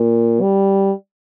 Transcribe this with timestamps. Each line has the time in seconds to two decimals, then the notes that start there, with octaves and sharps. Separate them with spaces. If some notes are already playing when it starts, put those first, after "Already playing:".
Already playing: A#2
0.41 G3